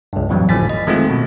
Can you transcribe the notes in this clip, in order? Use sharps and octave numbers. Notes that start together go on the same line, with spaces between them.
C#2 G2
F2 A2 E3 F#3 G3
G1 A2 F3 G#5 A6 B6
D#5
D#3 G#3 A3 C4 F4
B2